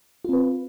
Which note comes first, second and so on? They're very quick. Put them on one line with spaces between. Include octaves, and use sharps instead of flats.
F4 C4 B4